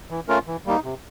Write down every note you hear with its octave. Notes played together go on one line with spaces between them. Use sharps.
E3
A3 C#4 F4 A#4
E3
G3 A#3 D#4
C3